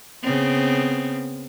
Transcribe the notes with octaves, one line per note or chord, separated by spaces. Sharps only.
C#3 B3 C4